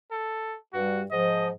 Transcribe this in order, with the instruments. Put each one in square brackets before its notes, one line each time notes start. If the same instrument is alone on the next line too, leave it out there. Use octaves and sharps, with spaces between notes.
[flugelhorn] A4
[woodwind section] G2 G3 [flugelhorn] F#4
[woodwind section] G#2 F3 [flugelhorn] D#5